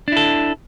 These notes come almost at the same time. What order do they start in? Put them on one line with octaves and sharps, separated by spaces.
D4 E4 A4